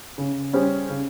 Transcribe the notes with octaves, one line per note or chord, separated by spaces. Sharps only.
C#3
G3 C#4 G#4 C5
C#3